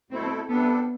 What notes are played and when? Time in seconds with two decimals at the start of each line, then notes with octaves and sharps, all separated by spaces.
0.10 B2 A3 C4 E4 A4
0.49 C3 G3 B3 D4 A4